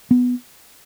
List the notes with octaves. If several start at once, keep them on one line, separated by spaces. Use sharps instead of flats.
B3